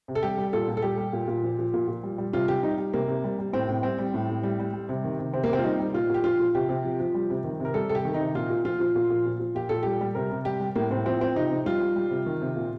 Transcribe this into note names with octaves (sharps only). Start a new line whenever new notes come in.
C3
A4
G3 G4
G3
A#2 A4
A#2
A4
G3 G4
G3
A#2
A#2
F3
F3
A#2
A#2
G3
G3
C3 F4
C3 G4
G3 D#4
G3
C3 A#3
C3
G3
G3
A2 C4
A2
G3 C4
G3
A2
A2
G3
G3
G3
C3
D#3
C3
C3 C4
A#3
C3 C4
F4
G3 D#4
G3
A#2 F4
A#2 G4
F3 F4
F3
C3 G4
C3
F3
F3
G3
C3
D#3
C3 A#4
G3 A4
C3 A4
G4
D#3
D#4
C3
A#2 F4
A#2
F3 F4
F3
A#2
A#2
F3
F3
A#2 G4
A#2 A4
G3 G4
G3
C3 A#4
C3
G3 G4
G3
A2 A#3
A2 C4
F3 C4
F3 C4
C3 D#4
C3
G3 F4
G3
G3
C3
D#3
C3
A#2